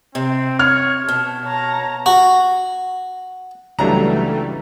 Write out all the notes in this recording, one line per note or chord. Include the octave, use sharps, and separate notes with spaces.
C3 C4
C#5 F6
B2 A5
C#5 A5 A#5
F#4
C#2 E3 F#3 G3 A3 D4 A#5